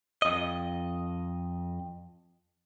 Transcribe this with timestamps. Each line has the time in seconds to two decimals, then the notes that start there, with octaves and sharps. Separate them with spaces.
0.22 F2 D#5